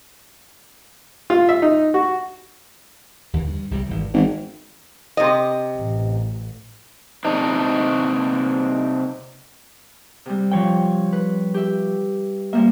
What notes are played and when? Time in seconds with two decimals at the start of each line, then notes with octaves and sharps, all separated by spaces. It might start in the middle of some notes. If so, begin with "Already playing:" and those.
1.30 F4
1.49 E5
1.62 D#4
1.94 F#4
3.33 D#2 D3 E3
3.47 G2
3.71 C2 C3 G3
3.88 G#1 E3
4.14 G#1 E3
5.17 C3 D#5
5.75 A1
7.25 C3 D4 D#4
10.26 C3 G3
10.52 F3 C#5 G5
11.13 B4
11.54 G4 E5
12.53 F3 G3 A#3 E5